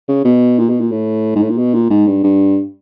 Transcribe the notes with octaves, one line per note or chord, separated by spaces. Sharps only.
C#3
B2
A#2
B2
A#2
A2
G#2
A2
A#2
B2
A#2
G#2
G2
G2